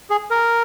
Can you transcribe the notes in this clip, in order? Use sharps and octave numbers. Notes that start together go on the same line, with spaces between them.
G#4
A#4